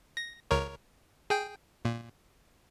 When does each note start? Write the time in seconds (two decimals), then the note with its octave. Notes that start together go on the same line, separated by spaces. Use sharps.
0.17 A#6
0.51 C#2 A#4 C#5
1.30 G#4 G5
1.85 A#2